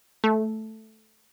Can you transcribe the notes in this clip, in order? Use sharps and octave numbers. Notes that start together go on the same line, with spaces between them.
A3